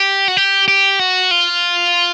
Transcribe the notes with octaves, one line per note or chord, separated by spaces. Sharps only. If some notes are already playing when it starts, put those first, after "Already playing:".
Already playing: G4
F#4
G4
G4
F#4
F4